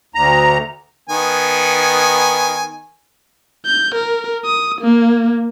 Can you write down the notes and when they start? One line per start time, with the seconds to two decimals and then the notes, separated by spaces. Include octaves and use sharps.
0.15 D2 A#5
1.09 D#3 B3 G#5
3.66 G6
3.95 A#4
4.45 D#6
4.81 A#3